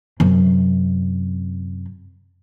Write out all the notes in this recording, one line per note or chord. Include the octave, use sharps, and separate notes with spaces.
F#2 C3